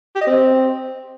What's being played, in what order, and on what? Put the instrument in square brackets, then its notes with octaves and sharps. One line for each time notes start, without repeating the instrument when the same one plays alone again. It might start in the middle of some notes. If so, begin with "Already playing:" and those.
[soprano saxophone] G4
D#5
C4